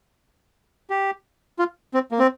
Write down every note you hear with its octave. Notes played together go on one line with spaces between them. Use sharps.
G4
F4
C4
A#3
C4